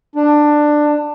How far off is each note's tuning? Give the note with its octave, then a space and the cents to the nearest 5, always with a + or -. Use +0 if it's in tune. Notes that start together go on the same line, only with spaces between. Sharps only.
D4 +15